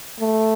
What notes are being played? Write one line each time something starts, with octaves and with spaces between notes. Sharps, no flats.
A3